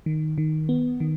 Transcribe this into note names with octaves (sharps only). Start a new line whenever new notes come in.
D#3
D#3
B3
D#3